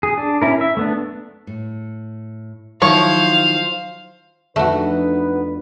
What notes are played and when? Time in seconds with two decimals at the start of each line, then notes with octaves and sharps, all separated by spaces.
0.03 G#4
0.17 D4
0.42 C#4 E4 A#4
0.61 E5
0.77 A3 B3 D4
1.47 A2
2.82 D#3 F3 F#3 E4 C5 C#5 F5
4.56 F2 A3 B3 D4 D#4 F#4 B4